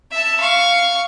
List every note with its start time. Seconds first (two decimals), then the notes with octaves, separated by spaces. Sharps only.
0.12 E5 A5
0.40 F5 C#6